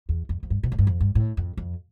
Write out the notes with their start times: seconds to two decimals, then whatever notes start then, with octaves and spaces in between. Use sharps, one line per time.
0.09 E2
0.29 F2
0.43 F2
0.50 G2
0.63 B2
0.72 A2
0.79 G2
0.87 F2
1.00 G2
1.15 A2
1.37 F2
1.57 F2